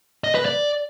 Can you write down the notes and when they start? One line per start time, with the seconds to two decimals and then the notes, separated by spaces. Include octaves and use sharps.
0.24 D#5
0.35 B4
0.45 D5